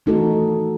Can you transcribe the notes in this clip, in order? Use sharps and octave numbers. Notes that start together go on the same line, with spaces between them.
E3 A3 D#4 F#4 A4